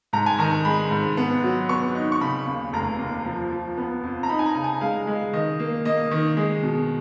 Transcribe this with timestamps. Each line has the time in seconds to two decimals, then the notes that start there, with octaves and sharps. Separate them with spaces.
0.13 G#2 A#5
0.26 G#5
0.38 D#3 A#5
0.65 G#3 B5
0.91 G#2
1.17 B3
1.43 F#3
1.69 B3 C#6
1.95 D#4
2.12 C#6
2.21 C#3 B5
2.46 D#2
2.73 F1 A#5
2.99 D#2
3.25 F3
3.51 F3
3.77 B3
4.03 F2
4.23 A#5
4.29 D#4 B5
4.39 G#5
4.46 A#5
4.55 C#3
4.64 G#5
4.81 G#3 F5
5.07 G#3
5.33 D#3 D#5
5.59 A#3
5.85 A#3 D#5
6.11 D#3
6.37 G#3
6.63 B2